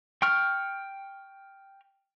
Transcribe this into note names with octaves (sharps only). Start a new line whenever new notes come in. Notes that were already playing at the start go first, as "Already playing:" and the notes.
G5 C#6 F6